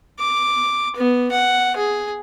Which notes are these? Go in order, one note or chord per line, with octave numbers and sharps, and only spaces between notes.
D6
B3
F#5
G#4